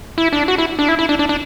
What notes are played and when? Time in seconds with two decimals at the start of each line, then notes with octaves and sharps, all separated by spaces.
0.18 E4
0.33 D4
0.48 F#4
0.58 E4
0.79 D4
0.88 E4
0.99 E4
1.09 D4
1.19 D4
1.29 D4